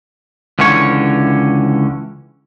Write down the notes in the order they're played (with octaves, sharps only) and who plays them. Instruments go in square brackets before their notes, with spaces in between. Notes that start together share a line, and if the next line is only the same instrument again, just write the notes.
[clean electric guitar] C#2 D3 E3 C#4 C#5